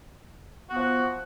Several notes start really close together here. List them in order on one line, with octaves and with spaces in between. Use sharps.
F#4 B3 F3